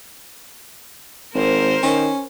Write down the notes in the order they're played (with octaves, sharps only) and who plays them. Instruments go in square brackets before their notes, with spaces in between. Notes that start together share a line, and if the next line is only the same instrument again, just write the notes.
[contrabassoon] G#1 [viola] A#4 C5
[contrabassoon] D#3 [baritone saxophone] C#4